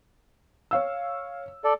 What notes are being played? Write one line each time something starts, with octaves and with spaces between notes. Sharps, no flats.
C#5 F5 E6
A4 D5